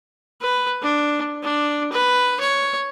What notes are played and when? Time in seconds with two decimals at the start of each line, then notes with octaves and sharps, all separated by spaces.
0.41 B4
0.82 D4
1.43 D4
1.92 B4
2.40 C#5